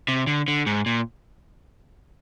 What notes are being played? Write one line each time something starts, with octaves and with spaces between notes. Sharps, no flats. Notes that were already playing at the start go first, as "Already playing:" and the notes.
C3
D3
D3
G#2
A#2